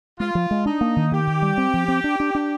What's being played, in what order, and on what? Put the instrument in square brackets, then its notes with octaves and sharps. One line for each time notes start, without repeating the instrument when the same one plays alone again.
[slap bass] G#3 [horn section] F4
[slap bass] F3
G#3
[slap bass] D4 [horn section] D#4
[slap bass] A#3
D#3
[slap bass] D#3 [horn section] G4
[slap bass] D#3
G3
C4
F3
C4
D4
D4
D4